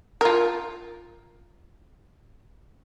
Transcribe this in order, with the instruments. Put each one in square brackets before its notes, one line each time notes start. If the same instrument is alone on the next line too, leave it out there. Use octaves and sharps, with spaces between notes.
[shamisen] F4 A#4